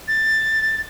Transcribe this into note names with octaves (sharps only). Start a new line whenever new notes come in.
A6